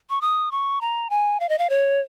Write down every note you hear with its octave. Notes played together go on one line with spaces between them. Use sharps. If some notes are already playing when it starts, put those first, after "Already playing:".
C#6
D#6
C#6
A#5
G#5
F5
D#5
F5
C#5